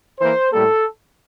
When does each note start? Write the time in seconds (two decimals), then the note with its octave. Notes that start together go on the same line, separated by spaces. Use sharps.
0.20 E3 A#3 C5
0.51 A2 G3 A#3 A4